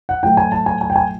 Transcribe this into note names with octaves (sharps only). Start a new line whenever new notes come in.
F#5
A2 F#3 A3 G5
G#5
A5
G#5
G#5
G5
G#5